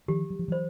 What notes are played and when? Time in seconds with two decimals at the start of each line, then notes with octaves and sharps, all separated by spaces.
0.08 D#3 F3 G4
0.30 F#3
0.39 F3
0.48 E3 F#3 C5